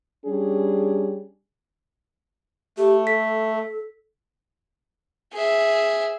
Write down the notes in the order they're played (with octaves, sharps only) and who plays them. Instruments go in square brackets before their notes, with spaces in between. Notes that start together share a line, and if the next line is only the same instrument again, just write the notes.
[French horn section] G3 C#4 D4 G#4
[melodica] A3 [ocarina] G4
[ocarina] A4 [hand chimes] B6
[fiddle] G#4 E5